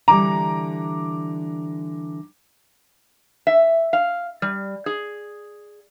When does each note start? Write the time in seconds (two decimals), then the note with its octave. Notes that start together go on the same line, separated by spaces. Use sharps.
0.08 D3 E3 G3 A#5 D6
3.47 E5
3.93 F5
4.42 G3
4.86 G#4